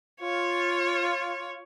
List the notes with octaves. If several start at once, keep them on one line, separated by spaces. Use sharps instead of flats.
F4 C#5